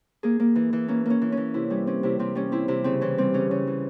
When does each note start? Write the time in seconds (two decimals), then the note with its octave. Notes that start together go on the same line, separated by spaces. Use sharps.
0.23 A#3 G#4
0.40 A#3
0.56 E3
0.73 E3
0.88 A#3 C#4
1.05 A#3 C#4
1.22 E3
1.32 C#4
1.37 E3
1.54 C3 E4
1.70 G3 C#4
1.87 C4 C#4
2.03 C3 E4
2.19 C3 C4
2.35 G3 C#4
2.52 C4 E4
2.68 C3 E4
2.84 C#3 C4
3.01 E3 C#4
3.18 G3 C4
3.34 C#3 C#4
3.51 C#3
3.67 E3